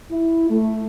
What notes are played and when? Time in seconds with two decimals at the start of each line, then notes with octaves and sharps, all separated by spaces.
0.11 E4
0.50 A3